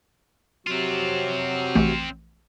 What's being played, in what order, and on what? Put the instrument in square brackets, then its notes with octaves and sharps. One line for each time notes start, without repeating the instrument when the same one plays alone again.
[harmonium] C3 F#3 F#4 [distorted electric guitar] C4 F4
[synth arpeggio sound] A#1 E3 A3